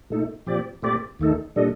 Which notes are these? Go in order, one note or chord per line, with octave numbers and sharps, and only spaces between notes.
A#2 A3 D#4 A4
A#2 F3 C4 G4 D5
A#2 A3 C4 G4 D5
D#2 D#3 A3 D#4 A4
A#2 G3 D4 A4 D#5